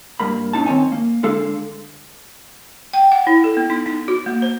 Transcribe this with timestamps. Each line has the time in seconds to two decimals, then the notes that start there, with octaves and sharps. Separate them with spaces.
0.20 G2 A#3 B5
0.53 A#2 C#4 D#4 A5
0.66 D#3 G#3 C4 C#5 G#5
0.92 A#3
1.23 D3 G#3 A4 F5
2.93 G5
3.12 F#5
3.27 E4
3.44 A4
3.57 B3
3.70 D#4
3.86 D#4
4.08 F#4
4.26 A#3
4.42 C5